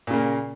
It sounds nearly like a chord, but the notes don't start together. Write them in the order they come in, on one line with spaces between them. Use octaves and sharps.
A#2 C#3 A#3